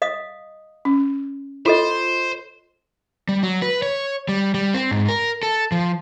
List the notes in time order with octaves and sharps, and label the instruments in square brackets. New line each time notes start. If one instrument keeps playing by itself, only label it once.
[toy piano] D#5 F5 D#6
[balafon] C#4
[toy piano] F4 A4 D#5 [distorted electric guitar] C5
[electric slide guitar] G3
F#3
B4
C#5
G3
G3
C4
G#2
A#4
A4
F3